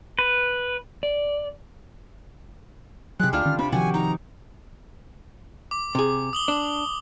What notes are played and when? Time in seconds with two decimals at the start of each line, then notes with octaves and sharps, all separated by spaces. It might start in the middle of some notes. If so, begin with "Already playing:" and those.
0.19 B4
1.03 D5
3.20 C3 F#3 G#3 G4 F#6
3.33 D2 G3 D4 F4 F6
3.45 D3 D#3 C#4
3.59 C3 B3 D4 B5
3.72 C3 D#3 F3 F#4 G4 F#5 G#5
3.94 D#4 A#5
5.71 D6
5.95 C3 G#4
6.33 D#6 F#7 G7
6.48 D4